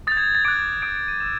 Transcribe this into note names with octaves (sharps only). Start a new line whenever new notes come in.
D#6 G6 A6
G#6
A6
D6 F#6 D7
D#6 G6 D7
D7
D#7
C#6 E6 G6 E7